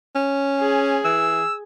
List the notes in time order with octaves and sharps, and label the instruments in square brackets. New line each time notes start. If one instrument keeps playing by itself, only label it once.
[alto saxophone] C#4
[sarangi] G#4
[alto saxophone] E3 [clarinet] E6